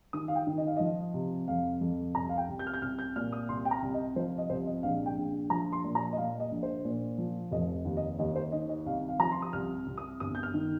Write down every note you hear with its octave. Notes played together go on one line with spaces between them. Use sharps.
D#3 D#6
F5
G5
D#3
D#5
F5
F3 D#5
C3
F2 F5
F2
C2 A#5
F5
G5
C2
G6
F6
G6
C2 F6
G6
A#2 F6
D#6
C2 C6
G5
A#5
C2
D#5
F3 C5
D#5
C2 C5
D#5
A#1 F5
G5
A#1
F3 A#5
C6
A#2
A#5
D#5
A#2 F5
D#5
A#1
C5
A#2
F3
F1 D#5
D#2
D#5
D#2 D#5
C5
D#3 D#5
D#5
C2 F5
F5
F3 A#5
C6
D#6
C2 F6
C2
D#6
G1 D#6
G6
F6
D#3